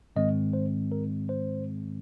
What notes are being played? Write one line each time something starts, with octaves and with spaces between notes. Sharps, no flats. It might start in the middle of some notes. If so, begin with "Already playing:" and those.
G#2 D#3 G#3 C4 D#5
C5
A#4
C5